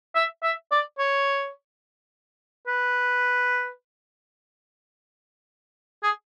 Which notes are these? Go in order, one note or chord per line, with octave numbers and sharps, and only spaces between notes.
E5
E5
D5
C#5
B4
G#4